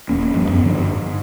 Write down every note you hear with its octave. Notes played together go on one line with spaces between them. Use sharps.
D#1 E2 A#3 C#4
G2 F3
F#2 B3
G2 D3 F3 D4
G#2